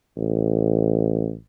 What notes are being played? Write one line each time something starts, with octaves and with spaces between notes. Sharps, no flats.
A1